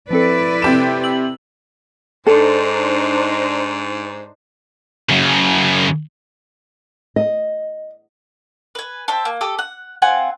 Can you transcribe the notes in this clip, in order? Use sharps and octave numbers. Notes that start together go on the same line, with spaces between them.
F3 C4 E4 A4 B4 D5
C3 G4 E7
E6 F#7
G#2 D4 D#4 A4 C5
F#2 C#3
D#5
B4 G#5
C5 E5 G5 A5
A#3
G4 A4 D#6
F#5
C4 F4 F#5 G#5